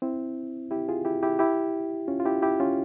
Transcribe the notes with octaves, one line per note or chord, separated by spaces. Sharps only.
C4 E4
E4 G4
F4 G#4
E4 G4
E4 G4
E4 G4
C#4 F4
F4
E4 G4
E4 G4
C#4 F4